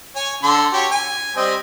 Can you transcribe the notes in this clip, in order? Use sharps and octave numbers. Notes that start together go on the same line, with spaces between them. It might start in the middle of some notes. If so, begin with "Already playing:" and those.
C#5 G#5
D3 A4 C6
F#4 G4 C#5
G#5
G3 C4 D#5